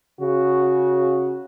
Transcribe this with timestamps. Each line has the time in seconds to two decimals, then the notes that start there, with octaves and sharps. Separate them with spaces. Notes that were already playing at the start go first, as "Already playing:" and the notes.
0.20 C#3 F#4